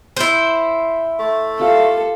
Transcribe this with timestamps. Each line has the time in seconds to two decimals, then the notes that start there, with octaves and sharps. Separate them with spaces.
0.17 E4 C5
1.19 A3
1.60 F4 G4 A4 F5